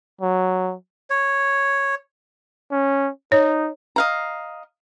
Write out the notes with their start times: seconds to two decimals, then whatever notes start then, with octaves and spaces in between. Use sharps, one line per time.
0.21 F#3
1.10 C#5
2.71 C#4
3.32 D#4 C#5
3.96 D#5 F5 A#5